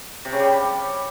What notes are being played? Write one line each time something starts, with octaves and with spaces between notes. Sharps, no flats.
C3
C#3
G3